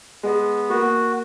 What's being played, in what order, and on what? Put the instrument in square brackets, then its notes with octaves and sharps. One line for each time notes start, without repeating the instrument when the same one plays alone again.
[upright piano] G#3 [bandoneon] B3
[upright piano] A#3 [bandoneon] F#4